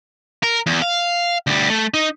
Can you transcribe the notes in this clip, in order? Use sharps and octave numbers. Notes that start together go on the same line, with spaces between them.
A#4
E2
F5
D2 G3
A3
D#4